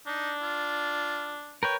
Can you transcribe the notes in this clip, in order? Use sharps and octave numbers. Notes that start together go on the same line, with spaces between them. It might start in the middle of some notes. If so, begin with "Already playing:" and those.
D4 D#4
F4
A#4 B4 C#5 G5